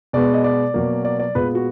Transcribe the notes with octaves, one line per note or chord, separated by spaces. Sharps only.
B2 G#3 B3 D5
D#5
D5
B2 F#3 A#3
D5
D5
A#2 G#3 B3 B4
F#4